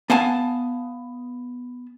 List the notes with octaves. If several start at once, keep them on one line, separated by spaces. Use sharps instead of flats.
B3 F5 G#5 A5